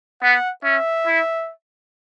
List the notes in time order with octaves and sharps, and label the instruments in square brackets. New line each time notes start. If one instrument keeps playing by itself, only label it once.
[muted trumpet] B3 [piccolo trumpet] F#5
[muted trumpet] C#4 [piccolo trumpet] E5
[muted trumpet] E4